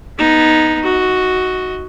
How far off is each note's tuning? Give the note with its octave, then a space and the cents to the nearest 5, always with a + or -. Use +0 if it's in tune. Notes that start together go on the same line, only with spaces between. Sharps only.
B3 -15 D#4 +0
F#4 +0 D#5 +30